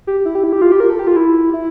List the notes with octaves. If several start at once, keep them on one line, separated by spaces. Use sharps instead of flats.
G4
E4
G4
E4
G4
F4
G4
A#4
A4
G4
F4
E4
E4